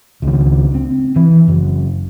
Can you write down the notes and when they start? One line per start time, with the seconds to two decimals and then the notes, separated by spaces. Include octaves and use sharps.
0.22 C#2 D#3
0.75 C4
1.16 E3
1.48 F#1